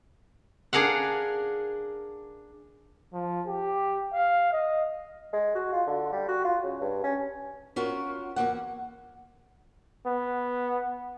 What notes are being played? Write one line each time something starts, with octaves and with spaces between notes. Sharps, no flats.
D4 G#4 A#4 F5 F#5
F3
G4
F5
D#5
G#3
F#4
F4
D3
G3
F#4
F4
C#3
G2
C#4
C#4 F4 F#4 A#4
E2 E3 A#3 F#5
B3